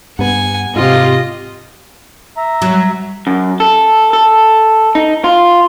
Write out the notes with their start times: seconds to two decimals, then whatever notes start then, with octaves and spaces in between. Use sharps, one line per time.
0.19 G2 B3 F#5 G#5
0.76 G#2 C3 F4 G4 D#5
2.37 E5 A#5
2.62 F#3
3.27 F#2
3.60 A4
4.13 A4
4.95 D#4
5.24 F4